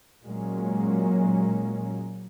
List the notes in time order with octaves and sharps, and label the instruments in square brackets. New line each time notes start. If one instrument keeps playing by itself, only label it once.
[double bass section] A#2 F#3 G#3 A#3 C#4